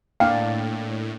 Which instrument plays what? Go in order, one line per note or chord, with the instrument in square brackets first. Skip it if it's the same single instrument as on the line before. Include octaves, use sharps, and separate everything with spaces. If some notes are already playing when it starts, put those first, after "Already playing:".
[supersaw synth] A2 [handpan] A#3 D4 D5 [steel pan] F5 [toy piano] G5